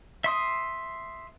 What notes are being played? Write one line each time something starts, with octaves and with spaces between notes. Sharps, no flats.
E5 C6 D#6